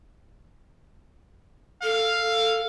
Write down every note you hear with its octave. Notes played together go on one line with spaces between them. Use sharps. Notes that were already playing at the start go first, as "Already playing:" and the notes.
A4 F5